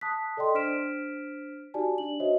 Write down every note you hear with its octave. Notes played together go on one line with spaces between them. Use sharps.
A5 D#6 F#6 B6
A4 D5 D#5 G5 C6
D4 C5 F6 B6 D7 E7
D#4 F#4 G4 D5 G#5 A5
D4 F#7
F#4 C5 C#5 D#5 E5